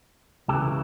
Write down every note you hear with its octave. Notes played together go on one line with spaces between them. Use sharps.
C#2 C#3 E3 G4 A4